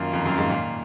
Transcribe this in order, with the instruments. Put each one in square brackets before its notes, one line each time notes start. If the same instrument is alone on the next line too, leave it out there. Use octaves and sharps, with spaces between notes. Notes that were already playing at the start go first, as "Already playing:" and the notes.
Already playing: [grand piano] F#2 [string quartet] D#3 A#3 F4
[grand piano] F2
F#2
G#2
A#2